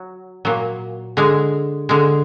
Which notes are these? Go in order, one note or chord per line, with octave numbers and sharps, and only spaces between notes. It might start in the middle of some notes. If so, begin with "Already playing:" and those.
Already playing: F#3
A#2 F#3
D3 G#3
D3 G#3